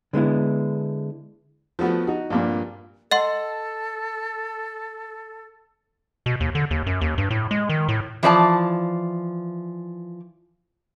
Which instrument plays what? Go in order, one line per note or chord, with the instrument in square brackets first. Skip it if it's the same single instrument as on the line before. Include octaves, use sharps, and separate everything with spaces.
[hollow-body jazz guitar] D3 G#3 B3 E4
[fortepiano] F3 A3 B3 F#4
D#4 F#4
A#1 G2 A#2
[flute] A4 [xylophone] D#5 F#5 C6
[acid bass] B2
D#2
D3
D#2
F#2
D#2
G2
A2
G#3
D#3
A2
[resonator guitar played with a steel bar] E3 F3 D5 A5